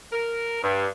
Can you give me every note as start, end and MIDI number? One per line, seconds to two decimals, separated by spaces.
0.13 0.59 70
0.62 0.86 43